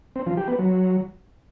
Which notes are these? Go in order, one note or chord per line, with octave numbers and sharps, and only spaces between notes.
C4
F3
G4
B3
F#3